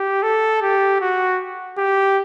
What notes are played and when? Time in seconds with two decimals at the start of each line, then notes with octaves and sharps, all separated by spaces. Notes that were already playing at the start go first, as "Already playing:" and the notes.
Already playing: G4
0.23 A4
0.62 G4
1.01 F#4
1.78 G4